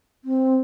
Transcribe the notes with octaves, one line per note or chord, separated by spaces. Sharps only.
C4